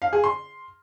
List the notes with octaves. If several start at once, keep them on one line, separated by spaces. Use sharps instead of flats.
F5
G#4
C6